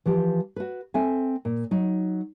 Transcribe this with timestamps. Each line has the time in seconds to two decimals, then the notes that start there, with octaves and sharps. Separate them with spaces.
0.06 E3 F3 G4
0.56 F#4 B4
0.94 C4 A4 E5 G#5
1.45 A#2
1.71 F#3 D#4